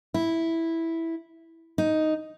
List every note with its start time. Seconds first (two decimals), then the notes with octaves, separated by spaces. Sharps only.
0.14 E4
1.78 D#4